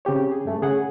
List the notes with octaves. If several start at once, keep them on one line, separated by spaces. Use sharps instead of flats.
C#3 C4 G4 C#5
G#4
G2 A3
C#3 G#4 F#5